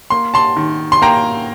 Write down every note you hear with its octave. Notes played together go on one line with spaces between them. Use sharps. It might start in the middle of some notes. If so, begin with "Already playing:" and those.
A#3 C6
A5 C6
D#3
C6
A#3 G5 A#5